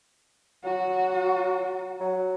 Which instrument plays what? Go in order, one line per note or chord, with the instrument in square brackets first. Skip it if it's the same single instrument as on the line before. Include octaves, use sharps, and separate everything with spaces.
[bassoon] F#3 [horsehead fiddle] F#4
[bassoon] F#3